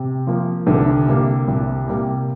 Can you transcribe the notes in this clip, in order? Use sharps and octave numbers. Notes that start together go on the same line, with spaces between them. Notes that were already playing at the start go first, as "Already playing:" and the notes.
Already playing: C3
F3 A#3
C2 D3
C3 G3 A#3
C2
C3 G3 A#3